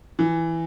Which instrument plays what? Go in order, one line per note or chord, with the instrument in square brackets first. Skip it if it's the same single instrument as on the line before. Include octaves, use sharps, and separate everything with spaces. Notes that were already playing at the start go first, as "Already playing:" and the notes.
[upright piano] E3